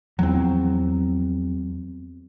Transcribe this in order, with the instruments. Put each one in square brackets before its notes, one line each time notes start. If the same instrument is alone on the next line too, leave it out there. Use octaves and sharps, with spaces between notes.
[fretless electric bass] E2 F3 [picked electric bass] F#3 C4